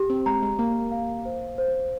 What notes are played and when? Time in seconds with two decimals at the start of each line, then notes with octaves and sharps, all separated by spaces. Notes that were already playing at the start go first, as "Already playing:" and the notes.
Already playing: G4
0.10 C4
0.26 G#3 A#5
0.42 G#3
0.59 A#3 A#5
0.92 F5
1.25 C5
1.58 C5